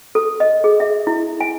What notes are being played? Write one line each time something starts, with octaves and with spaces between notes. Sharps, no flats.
A4
D#5
G#4
E5
E4
G#5